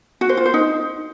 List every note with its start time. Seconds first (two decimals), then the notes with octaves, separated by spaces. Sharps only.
0.21 F#4
0.29 C5
0.37 F4
0.46 C5
0.54 D#4